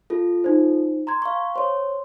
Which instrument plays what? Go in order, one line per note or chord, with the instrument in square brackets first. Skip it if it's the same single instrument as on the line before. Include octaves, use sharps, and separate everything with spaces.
[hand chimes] F4 A4
[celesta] D#4 C5
A#5 C6 G#6
[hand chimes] F5 C#6
[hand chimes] C5 C#5 [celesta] C6